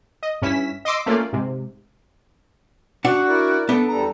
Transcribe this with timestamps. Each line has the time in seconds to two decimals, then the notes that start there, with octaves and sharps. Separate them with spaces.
0.23 D#5
0.42 G2 C#4 E4 B6 E7
0.85 D#5 C6 D6 E6
1.06 A3 A#3 C#4 F4 D5
1.33 G#2 C3
3.05 D4 F#4 F#5
3.27 E4 A#4 D5
3.69 B3 D4 A4
3.88 E2 G3 A4 A#5